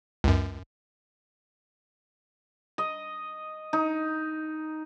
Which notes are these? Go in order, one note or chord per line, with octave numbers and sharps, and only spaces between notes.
C#2 F#2
D#5
D#4